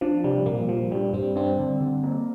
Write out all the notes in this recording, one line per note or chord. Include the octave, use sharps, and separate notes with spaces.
F3 D4
C3 G3
A#2 F3 A#3
A#2 F3
G2 G3
G2 G3 C4
G3 C4 D4
D3
D3
A#3